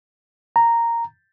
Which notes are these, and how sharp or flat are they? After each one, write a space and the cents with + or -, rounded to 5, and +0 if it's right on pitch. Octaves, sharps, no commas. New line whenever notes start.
A#5 -5